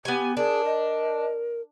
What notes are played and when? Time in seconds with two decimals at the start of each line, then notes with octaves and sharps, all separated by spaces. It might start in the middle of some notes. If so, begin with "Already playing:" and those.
0.05 B3 G4 G#5
0.37 D4 G#4 A#4
0.65 D#5